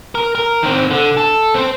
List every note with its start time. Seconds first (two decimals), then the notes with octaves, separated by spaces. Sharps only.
0.15 A#4
0.35 A#4
0.63 D#3 C4
0.91 D3
1.17 A4
1.54 C4 C5